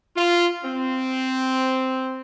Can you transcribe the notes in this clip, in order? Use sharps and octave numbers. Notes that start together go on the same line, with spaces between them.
F4
C4